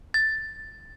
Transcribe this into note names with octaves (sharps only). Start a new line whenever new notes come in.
A6